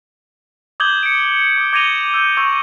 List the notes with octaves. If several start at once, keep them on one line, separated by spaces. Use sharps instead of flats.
D6 D#6 G6 G#6 F#7 G7
C#7 D7
D6 D#6
D6 G#6 A#6 D#7 F7 G7
E6 G6 G#6
C#6 E6 G#6